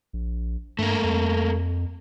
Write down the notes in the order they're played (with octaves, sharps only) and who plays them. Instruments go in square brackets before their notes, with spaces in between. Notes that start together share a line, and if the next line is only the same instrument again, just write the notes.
[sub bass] A#1
[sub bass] G2 [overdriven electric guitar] A3 A#3
[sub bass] F2